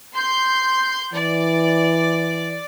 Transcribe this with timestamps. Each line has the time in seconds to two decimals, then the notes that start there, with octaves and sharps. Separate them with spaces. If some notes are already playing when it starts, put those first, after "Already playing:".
0.13 C6 G6
1.13 E3 D5